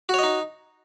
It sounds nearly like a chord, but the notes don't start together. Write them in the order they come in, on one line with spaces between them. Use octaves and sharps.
F#4 C#5 D#5 D#4